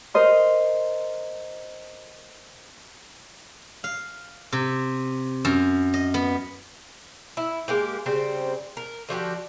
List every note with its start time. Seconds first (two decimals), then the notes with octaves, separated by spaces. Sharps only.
0.14 A#4 C5 D#5 C6
3.84 F5
4.52 C3
5.45 F#2
5.94 D#5
6.14 B3
7.37 E4
7.68 G#3 A#3 G4
8.06 C#3 G3 C4 C5
8.77 A#4
9.09 D3 F3 F#4 G4